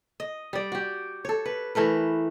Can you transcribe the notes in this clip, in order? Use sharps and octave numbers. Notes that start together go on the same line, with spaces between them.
D#5
G3 D5
F#4 G4
A4 C#5
B4
E3 A3 A#4 B4